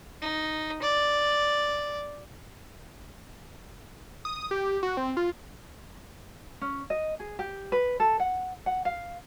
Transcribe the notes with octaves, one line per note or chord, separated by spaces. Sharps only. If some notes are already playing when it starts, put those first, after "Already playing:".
D#4
D5
D#6
G4
F#4
C4
F4
C#4
D#5
G#4
G4
B4
A4
F#5
F#5
F5